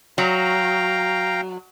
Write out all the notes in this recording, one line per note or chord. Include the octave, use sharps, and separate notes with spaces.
F#3 F5 G5 A#5